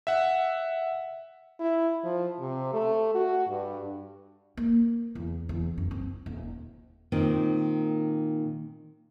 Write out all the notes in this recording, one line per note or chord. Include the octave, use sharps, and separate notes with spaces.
E5 F#5
E4
F3
C3
A3
F#4
G2
A#3
E2
E2
F#2
C4
D#1
A#2 D#3 C4